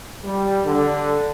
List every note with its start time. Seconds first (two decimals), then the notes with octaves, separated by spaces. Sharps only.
0.24 G3
0.66 D3